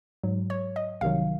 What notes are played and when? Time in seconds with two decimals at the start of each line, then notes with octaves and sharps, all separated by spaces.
0.23 G#2 F#3
0.50 C#5
0.76 D#5
1.01 C2 C3 D#3 F#3 F5